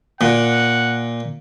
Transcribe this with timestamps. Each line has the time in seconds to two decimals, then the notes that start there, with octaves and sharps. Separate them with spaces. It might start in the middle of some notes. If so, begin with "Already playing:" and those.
0.21 A#2 F#5